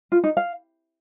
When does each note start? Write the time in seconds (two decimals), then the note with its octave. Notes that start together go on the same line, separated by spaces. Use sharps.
0.12 F4
0.24 D#4
0.37 F5